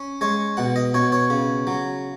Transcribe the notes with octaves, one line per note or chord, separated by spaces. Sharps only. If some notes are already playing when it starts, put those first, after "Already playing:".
Already playing: C#4
G#3 C#5
B2 F#5
D#5
B2 C#5
C#5
C#3
F#3